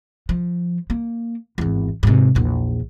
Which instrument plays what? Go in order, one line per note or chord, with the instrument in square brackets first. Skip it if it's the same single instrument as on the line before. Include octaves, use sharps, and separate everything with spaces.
[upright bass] F3
A#3
G#1 E2
G#2 C3
A#1 E2